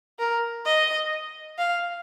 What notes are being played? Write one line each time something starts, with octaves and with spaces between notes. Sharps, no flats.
A#4
D#5
F5